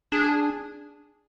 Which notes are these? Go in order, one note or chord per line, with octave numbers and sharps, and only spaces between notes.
D4 G#4